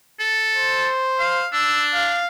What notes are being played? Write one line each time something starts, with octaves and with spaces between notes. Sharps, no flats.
A4
C5
F5
D4 E6
F5